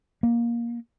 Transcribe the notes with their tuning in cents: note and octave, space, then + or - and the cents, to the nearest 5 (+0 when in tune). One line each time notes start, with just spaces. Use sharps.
A#3 +15